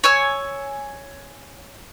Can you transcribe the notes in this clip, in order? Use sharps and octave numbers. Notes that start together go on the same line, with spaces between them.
C#5 G#5 E6